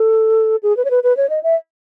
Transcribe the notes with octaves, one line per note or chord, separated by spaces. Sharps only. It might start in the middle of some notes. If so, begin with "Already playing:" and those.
Already playing: A4
G#4
B4
C#5
B4
B4
C#5
D#5
E5